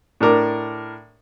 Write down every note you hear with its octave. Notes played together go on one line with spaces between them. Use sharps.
A2 D4 A#4 D6